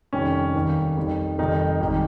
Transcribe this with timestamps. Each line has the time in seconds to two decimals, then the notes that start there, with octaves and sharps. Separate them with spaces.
0.13 F1 F2 D#3 G3 C#4
0.55 D#2 D#3 G3
0.97 F2 D#3 G3
1.39 F1 F2 C3 D#3 G3 D#4
1.81 G#1 D#3 G3